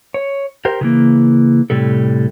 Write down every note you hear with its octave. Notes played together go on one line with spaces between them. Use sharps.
C#5
G4 A#4 C5
C#3 E3 A#3
A2 C3 G3 A4